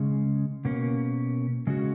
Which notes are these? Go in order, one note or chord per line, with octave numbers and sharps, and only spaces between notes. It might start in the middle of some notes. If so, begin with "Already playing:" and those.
Already playing: C#3 G#3 C#4
B2 A#3 C#4
C#3 G#3 C#4 F#4